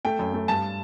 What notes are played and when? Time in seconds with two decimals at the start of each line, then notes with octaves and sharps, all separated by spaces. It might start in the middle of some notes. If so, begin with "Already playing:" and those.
0.05 A3 G5
0.19 F#2
0.34 A3
0.48 G2 A5